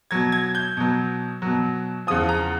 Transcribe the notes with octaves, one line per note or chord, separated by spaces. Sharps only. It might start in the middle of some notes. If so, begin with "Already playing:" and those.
B2 F#3 G#6
G#6
G6
B2 F#3
B2 F#3
E2 C#3 F3 D#6
A#5